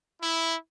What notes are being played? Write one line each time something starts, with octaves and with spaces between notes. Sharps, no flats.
E4